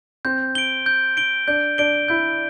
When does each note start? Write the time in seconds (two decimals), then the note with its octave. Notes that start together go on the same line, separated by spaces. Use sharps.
0.25 C4 G6
0.55 D7 G7
0.86 G6
1.17 D7 G7
1.47 D4 G6
1.78 D4 D7 G7
2.08 E4 G6